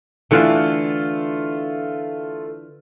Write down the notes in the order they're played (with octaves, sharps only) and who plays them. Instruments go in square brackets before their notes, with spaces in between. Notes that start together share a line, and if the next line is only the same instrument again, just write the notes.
[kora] D3 E3 F#5 [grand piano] A3 F4